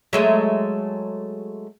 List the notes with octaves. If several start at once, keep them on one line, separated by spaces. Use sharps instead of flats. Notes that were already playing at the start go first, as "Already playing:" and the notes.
F#3 G#3 A3